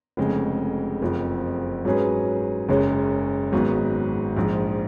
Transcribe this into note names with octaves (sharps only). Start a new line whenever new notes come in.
F1 F2 C#3 G#3
F#1 F2 F3
G#2 F#3 C#4 G#4 B4
F#1 F#2 C#3 G#3 C#4
G#1 G#2 F#3 B3
A#1 G#2 F3